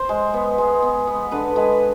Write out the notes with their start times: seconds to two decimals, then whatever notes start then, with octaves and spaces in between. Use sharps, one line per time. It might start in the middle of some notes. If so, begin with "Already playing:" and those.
Already playing: C5
0.09 G#3
0.34 B3
0.58 G#3
0.82 B3
1.07 B3
1.31 D3 B4
1.56 G#3 B4